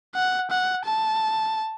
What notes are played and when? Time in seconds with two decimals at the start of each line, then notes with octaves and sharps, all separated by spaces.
0.15 F#5
0.50 F#5
0.85 A5